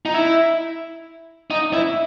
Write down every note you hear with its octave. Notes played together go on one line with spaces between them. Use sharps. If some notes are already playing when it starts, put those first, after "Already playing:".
D#4
E4
D#4
E4